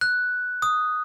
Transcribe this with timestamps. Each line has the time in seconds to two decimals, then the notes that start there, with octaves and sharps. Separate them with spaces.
0.01 F#6
0.62 D#6